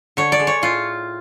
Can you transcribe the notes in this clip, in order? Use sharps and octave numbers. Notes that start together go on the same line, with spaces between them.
D3 C#5
D5
G#3
C#5
A2 F4